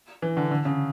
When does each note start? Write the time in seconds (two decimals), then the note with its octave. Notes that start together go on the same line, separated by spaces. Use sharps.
0.22 E3
0.37 D3
0.51 D3
0.65 C#3